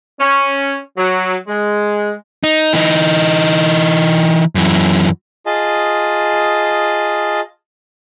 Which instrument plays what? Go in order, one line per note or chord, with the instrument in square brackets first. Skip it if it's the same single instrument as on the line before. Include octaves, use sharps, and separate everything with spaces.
[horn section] C#4
F#3
G#3
[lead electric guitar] D#4
E3 D#4
F#2 E3
[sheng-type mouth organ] F4 G#4 D#5 A5